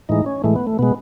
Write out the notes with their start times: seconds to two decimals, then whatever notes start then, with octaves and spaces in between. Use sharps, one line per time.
0.09 A2 E3 G#3 D#4
0.26 C#4
0.44 A2 E3 G#3 A3
0.56 B3
0.67 A3
0.79 B2 G#3 B3